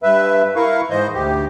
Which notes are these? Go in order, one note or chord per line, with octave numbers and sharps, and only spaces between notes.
G2 B4 E5
E4 A#4 F5 C#6
G#2 E3 C5 D#5 G6
D2 G4